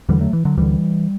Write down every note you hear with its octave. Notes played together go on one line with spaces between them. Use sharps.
E2 D3 E3 G3
F#3 A3
E3
D3 F#3
D2 D3 E3 G3